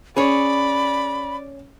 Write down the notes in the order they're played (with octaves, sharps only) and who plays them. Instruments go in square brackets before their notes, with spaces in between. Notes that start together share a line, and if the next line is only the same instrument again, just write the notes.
[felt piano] C#4 [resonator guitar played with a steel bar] G#4 C#5 [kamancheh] D5 [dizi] B5